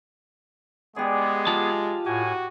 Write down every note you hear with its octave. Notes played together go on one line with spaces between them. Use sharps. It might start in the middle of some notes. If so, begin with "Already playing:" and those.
G#3 B3 G4 G#4 D5
F4 A5
A2 F#4 G#5